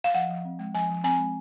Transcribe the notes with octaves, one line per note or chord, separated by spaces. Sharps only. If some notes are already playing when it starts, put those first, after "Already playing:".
F5
F3 F#5
F3
C4
G#3
F3 G#5
F3
C4 G#5
G#3